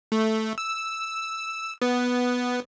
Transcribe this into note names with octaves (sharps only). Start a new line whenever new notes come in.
A3
E6
B3